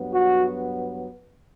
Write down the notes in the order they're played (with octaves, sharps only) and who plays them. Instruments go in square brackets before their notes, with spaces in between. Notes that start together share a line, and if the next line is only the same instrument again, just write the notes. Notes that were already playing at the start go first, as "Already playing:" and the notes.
Already playing: [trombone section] G2 F#3 B3
F#4